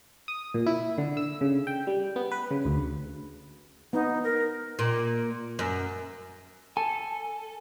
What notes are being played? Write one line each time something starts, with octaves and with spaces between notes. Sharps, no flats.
D#6
A#2
E4
D3
E6
C#3
G5
G3
B3
B4
C#3
D2
B3 D#4
A#4
A#2
F#2
A4 G#5